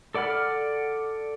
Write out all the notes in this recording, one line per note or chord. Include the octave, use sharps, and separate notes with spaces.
A4 D5 F#5 B5 F6